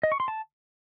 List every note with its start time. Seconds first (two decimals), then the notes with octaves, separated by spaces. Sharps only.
0.03 D#5
0.12 C#6
0.20 C6
0.28 A5